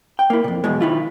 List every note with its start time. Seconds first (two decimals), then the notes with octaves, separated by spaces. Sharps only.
0.19 G5
0.30 A#3 E4
0.44 F2 A#2
0.64 B1 E2 B2 G#3
0.80 D#3 E4 F4